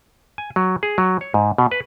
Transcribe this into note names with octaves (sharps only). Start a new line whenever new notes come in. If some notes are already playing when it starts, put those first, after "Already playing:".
G#5
F#3
G#4
F#3
C#5
G#2
B2
B4